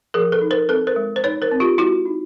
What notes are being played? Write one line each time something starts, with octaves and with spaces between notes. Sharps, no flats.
F3 G#4 A#4
A4 B4
D#4
A#4 C5
C4 A4 B4
A#4 C5
G#3
C5
D#4 B4 C#5
A#4 C5
C4
F4 G4
G#3 E4 F#4
D#4